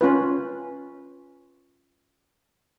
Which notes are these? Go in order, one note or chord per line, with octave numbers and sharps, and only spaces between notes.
C#4 F4 B4